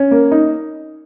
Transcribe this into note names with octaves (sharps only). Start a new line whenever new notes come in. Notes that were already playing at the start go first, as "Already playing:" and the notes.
Already playing: C#4
A#3
D#4